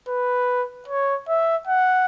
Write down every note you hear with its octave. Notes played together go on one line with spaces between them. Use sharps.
B4
C#5
E5
F#5